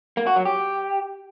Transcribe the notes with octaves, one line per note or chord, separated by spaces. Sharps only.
A#3
F#4
F#3
G4